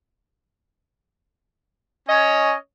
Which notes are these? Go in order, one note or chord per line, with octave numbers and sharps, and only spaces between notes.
C#4 C#5 D#5